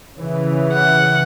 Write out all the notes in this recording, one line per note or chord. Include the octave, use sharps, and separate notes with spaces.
C#3 E3
F#5